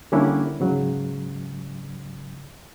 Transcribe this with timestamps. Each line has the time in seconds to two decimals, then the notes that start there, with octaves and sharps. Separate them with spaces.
0.12 D3 G3 A#3 C#4 D4 E4
0.60 G#2 C#3 F#3